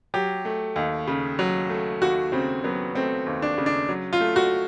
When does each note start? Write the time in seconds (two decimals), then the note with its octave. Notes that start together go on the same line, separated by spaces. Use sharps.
0.14 F#3 G4
0.45 A3
0.76 D#2
1.07 C#3
1.39 F#3
1.70 A3
2.01 D#2 F#4
2.32 C#3 C4
2.64 F#3 B3
2.95 A3 C4
3.26 D#2
3.42 D4
3.58 C#3
3.66 D4
3.89 F#3
4.13 F4
4.21 A3
4.36 F#4